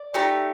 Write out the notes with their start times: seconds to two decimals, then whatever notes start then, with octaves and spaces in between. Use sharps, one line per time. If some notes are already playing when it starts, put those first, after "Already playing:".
Already playing: D5
0.14 A3 D#4 G4